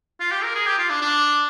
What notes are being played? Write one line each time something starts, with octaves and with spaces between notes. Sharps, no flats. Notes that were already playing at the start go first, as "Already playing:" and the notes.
F4
G4
A#4
G#4
G4
F4
D4
D4